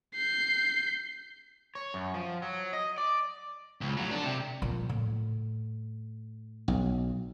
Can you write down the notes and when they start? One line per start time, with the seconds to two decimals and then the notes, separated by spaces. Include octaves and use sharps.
0.15 G6 C7
1.75 C#5
1.94 F#2
2.14 F3
2.42 F#3
2.73 D#5
2.98 D5
3.81 C#2
3.97 D2 F#3
4.11 D4 A4
4.24 C3
4.62 A#2 F3
4.89 A2
6.68 B1